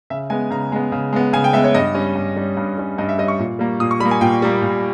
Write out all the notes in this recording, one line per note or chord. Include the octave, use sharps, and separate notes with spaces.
C#3 E5
G#3 B3 G#5
C#3 A#5
G#3 B3
C#3
G#3 B3
C#3 G#5
G5
G#3 B3 E5
C#5
G2 D#5
G3 C#4
G2
G3 C#4
G2
G3 C#4
G2 D#5
E5
G3 C#4 D#5
C#6
A#2
G3 A#3
A#2 D#6
C#6
G3 B5
A#3
G#5
A#2 G5
G3 A#3
A#2